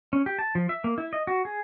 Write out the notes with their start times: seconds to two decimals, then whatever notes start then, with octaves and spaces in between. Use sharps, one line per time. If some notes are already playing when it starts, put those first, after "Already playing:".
0.13 C#4
0.26 G4
0.39 A5
0.55 F3
0.69 E5
0.84 A#3
0.98 E4
1.13 D#5
1.27 F#4
1.45 G#4